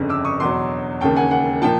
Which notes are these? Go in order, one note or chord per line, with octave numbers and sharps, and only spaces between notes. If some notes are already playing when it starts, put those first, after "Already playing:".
Already playing: G1 F2 C#3
D6 E6
C#6 D#6
E2 B2 F#3 C6 D6
E1 D#2 C#3 G5 A5
F#5 G#5
F#5 G#5
A#2 F3 G5 A5